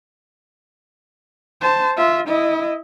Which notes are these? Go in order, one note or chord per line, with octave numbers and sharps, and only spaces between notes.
C5 A5
F4 E5
E4 D#5